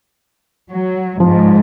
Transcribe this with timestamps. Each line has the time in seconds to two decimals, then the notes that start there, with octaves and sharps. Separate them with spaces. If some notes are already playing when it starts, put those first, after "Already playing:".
0.70 F#3
1.20 G#2 F3